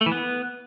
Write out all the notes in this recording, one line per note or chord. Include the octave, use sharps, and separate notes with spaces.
A3
E3
B3